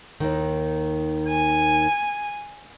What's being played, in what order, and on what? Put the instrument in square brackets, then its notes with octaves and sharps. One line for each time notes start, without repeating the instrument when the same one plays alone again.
[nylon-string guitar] D#2 D#3
[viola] G#5